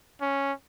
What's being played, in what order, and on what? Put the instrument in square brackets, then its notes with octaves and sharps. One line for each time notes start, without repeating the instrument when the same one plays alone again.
[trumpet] C#4